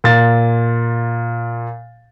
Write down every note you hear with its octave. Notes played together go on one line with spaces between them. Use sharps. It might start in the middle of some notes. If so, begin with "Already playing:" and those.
A#2 A6